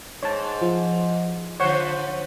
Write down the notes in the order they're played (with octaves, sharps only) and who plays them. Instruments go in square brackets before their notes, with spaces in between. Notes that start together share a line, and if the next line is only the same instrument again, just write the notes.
[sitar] G#2 [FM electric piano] C#5 A5
[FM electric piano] F3
[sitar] D3 F3 C5 [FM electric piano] C#5 F#5 C#6